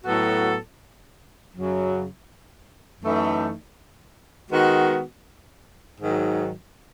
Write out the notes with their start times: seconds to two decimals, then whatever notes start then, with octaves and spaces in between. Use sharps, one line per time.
0.04 A2 F#3 B3 F#4 A4
1.53 F#2 C#3 F#3
3.01 F#2 E3 A3 D#4
4.50 D#3 G#3 B3 F#4
5.99 G#2 D#3 F#3